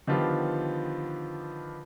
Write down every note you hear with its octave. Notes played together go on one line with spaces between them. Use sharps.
D3 D#3 F3 B3 F4 G4